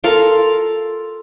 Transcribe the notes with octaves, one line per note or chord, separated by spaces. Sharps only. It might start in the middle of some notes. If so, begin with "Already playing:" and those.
F4 A4 A#4 F5